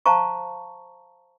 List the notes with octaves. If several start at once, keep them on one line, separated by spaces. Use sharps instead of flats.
C5 F5 A5 A#5 C#6